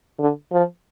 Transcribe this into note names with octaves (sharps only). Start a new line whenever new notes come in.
D3
F3